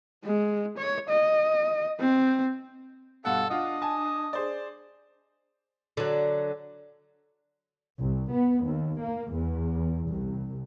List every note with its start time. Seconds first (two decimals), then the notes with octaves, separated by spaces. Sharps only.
0.24 G#3
0.78 C#5
1.09 D#5
2.00 C4
3.25 G2 B2 A4 F5 F#5
3.50 D4 F4 D#5 F#5
3.82 G#5 A5
4.33 G#4 C5 D5
5.97 D3 F#3
7.99 C2
8.33 B3
8.65 D#2
9.01 A#3
9.33 E2
10.08 C2